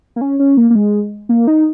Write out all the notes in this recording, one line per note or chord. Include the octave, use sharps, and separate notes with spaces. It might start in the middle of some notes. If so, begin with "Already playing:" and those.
A#3
C#4
C#4
A#3
A#3
G#3
A#3
D#4